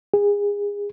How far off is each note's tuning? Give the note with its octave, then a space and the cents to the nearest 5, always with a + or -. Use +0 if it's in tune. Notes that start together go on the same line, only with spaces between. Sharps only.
G#4 -30